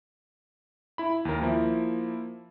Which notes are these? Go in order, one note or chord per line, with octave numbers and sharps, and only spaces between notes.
E4 B5
D#2 A#4
F3 A#3 E4